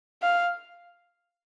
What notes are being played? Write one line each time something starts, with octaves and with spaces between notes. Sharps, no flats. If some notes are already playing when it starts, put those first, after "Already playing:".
F5